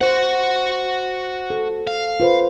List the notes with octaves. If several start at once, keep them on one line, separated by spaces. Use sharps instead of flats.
F#4 C5 F#5
A4
F5
F4 B4 C5